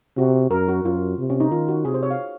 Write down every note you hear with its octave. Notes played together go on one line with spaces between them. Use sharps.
C3 F#4
F#2 A#4
F#4
F#2 F4
C3
C#4
D#4
D#3 F4
F#4
C3 G#4
C5
C#5
F5